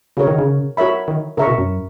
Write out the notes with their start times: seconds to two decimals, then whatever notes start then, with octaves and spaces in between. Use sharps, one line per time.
0.17 C#3 F#4 A#4 C#5
0.27 D#3
0.38 C#3
0.77 F#4 A#4 C#5 E5 B5
1.08 D#3
1.37 C#3 A#4 E5 A#5 C#6
1.47 B2
1.58 F#2